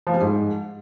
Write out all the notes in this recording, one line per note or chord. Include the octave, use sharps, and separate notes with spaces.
F3
G3
G#2